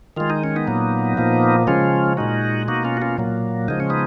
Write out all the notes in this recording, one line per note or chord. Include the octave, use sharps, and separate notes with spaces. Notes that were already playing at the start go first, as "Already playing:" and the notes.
D#3 G#3 F4
D#4
C#4
B3 D#4
A#2 F#3 A#3
A#2 F3 A#3
C#3 F3 G#3 C#4 F4
A#2 G#3 D#4 F#4
B2 A#3 D#4 F#4
C#4 F4
F#4
C#4 F4
A#2 F#3 A#3
C#3 F3 G#3 D#4
C#4
B3 D#4